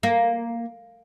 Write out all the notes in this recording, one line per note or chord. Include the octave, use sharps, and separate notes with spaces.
A#3